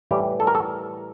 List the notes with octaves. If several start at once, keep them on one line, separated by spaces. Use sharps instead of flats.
A2 E3 G3 G4
A4
A#4
A4